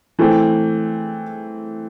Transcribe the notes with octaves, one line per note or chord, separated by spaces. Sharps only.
E3 A3 C4